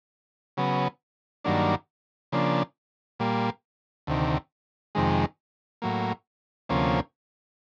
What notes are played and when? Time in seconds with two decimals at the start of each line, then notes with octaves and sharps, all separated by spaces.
0.57 C#3 F#3 B3
1.44 G2 D#3 F#3 A#3 D4
2.32 C#3 F3 A#3 D4
3.20 A#2 G3 A#3
4.07 D2 C3 D#3
4.95 F2 C3 D#3 G#3
5.82 A2 F#3 A#3
6.69 D2 C3 F3 A#3 C#4